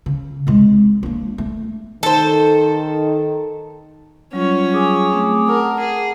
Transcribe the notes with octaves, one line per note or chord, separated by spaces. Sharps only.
C#3
C2 G#3
A#3 D4
A3
D#3 A4 C5
F#3 G3 C#4 F4 C#5
G#4 D6
A3 C4
A#4 F#5 A5
G#4